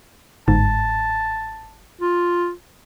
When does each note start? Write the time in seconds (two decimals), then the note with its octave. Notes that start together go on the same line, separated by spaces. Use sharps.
0.48 G1 G#2 A5
2.01 F4